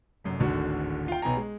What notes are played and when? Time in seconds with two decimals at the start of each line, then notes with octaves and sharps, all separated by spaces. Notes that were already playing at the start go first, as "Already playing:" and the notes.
0.24 F1 F#2
0.40 D1 G#1 D2 D3 F#4
1.08 F4 G5
1.22 B1 B3 G5 G#5 A#5
1.37 G#3